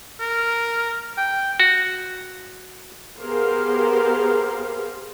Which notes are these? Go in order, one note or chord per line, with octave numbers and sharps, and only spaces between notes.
A#4
G5
F#4
B3 G4 G#4 A#4 C5 F5